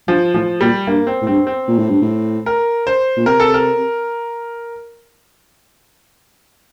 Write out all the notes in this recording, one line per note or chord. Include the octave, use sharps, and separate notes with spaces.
G2 F3
A2 F3
A#2 G3
G2 A#3
C4
A2
G2 C4
C4
A#2
A2
G2
A2
A#4
C5
A#2
C3 A#4
A4
A#4